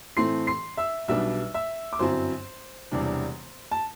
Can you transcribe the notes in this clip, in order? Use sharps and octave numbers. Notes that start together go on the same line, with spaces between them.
A2 E3 A3 C4 C6 C7
C6 C7
E5 E6
B1 B2 G3 B3 D4 E5 E6
E5 E6
D6
G1 F#2 F#3 C4 E4 C5 C6
E1 E2 C3 G3 D4
A5